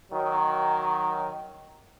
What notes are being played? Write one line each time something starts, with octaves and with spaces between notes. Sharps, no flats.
D#3 F#3